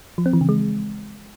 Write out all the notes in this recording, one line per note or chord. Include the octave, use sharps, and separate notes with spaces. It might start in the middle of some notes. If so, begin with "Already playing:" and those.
F3
C4
E3
C#3
G#3